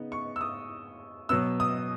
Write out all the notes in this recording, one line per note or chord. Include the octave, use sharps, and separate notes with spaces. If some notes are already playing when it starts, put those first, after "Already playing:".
Already playing: C#3 B3 D#4
C#6
E6
D#6
B2 F#3 B3 E6
D#6